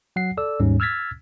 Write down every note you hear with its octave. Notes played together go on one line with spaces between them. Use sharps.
F#3 F#5 C7
A4 D5 E6
D#2 G#2 G3 G#3 C#4
E6 F6 G#6 A6 B6